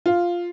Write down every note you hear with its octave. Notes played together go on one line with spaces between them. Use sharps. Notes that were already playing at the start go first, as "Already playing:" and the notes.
F4